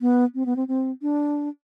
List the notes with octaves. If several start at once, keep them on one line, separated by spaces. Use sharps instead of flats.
B3
C4
B3
C4
C4
D4